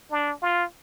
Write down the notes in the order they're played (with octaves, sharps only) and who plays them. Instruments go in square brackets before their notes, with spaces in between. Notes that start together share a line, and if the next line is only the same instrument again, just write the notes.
[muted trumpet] D4
F4